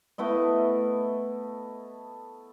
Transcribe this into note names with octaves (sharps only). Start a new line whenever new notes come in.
A3 B3 E4 D#5